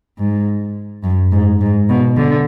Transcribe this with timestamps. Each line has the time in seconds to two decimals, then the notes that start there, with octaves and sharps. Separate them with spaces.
0.19 G#2
1.04 F#2
1.32 G#2
1.61 G#2
1.89 B2
2.17 D3